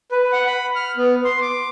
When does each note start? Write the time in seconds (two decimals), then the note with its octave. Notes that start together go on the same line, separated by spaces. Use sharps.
0.12 B4
0.33 F#5
0.46 B5
0.76 F6
0.97 B3
1.25 C6
1.42 D6